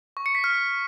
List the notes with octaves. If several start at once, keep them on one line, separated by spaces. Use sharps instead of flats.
C#6
C#7
B6
F6